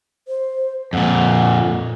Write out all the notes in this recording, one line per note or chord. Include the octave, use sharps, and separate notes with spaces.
C5
F2 A#2 F#5